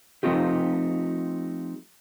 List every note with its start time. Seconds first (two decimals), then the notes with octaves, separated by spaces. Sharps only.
0.23 F3 A3 C4 D#4 F4 G4